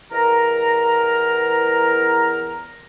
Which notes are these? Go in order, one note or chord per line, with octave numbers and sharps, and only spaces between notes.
E2 A#4 A#5